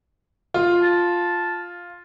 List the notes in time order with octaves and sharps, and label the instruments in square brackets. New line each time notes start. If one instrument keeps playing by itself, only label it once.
[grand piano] F4
[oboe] A5